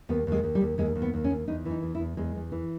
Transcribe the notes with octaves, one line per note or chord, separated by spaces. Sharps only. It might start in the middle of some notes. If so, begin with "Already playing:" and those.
D#2 B3
D#2 G#3
D#2
G3
D#2
D#2 G#3
D#2
B3
D#2
C#4
D#2
E2 D#4
E3
D#4
E2
E4
E2
E2 G#3
E2
E3